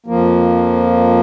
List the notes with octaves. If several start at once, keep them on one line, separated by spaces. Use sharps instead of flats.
F2 F3 A#3